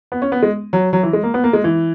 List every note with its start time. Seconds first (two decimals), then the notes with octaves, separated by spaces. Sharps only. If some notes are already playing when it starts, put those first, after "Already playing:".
0.12 B3
0.22 C#4
0.32 B3
0.42 G#3
0.73 F#3
0.93 F#3
1.03 E3
1.13 G#3
1.23 A#3
1.34 B3
1.44 A#3
1.53 G#3
1.64 E3